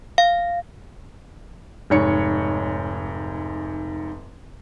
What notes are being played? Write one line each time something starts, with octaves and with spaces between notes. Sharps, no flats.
F5
F1 G#2 C#5 C#7